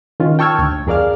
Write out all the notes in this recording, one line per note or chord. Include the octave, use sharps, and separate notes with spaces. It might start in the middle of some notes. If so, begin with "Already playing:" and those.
D#3 C#4 F4
G5 A5 C#6 E6 F6 G#6
D2
F2 G#4 A#4 D5 F5 F6